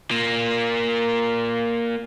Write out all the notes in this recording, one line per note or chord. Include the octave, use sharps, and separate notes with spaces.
A#3 F4